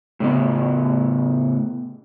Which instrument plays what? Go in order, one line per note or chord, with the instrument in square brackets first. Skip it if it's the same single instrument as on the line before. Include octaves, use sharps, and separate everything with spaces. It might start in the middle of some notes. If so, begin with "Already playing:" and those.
[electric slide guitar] A2 C#3 B3